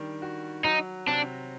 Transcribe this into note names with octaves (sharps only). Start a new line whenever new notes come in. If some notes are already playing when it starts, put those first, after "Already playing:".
Already playing: D#3 G3 D4
F#4
F#3 D#4
C3 D4